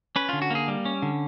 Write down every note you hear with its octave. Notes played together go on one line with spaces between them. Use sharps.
C#4 B4
D3 F4
F#4
A#3 G#4
G3
C#4
D3